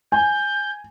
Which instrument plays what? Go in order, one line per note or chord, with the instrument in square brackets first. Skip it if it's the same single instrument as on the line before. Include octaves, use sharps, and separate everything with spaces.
[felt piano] G#5 [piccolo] G6